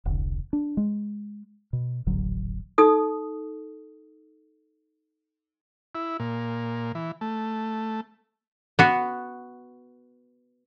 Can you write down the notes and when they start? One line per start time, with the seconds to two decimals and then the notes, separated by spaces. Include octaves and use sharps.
0.05 E1 C2 D3
0.53 D4
0.77 G#3
1.73 B2
2.07 D#1 A1 D3 F#3
2.78 D#4 A4 D#6
5.95 E4
6.20 A#2
6.95 E3
7.21 A3
8.79 B3 F#4